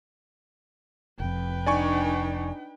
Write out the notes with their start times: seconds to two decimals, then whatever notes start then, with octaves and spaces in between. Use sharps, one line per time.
1.20 F1 F2 B4 G5
1.66 D4 D#4 D5 G#5 C#6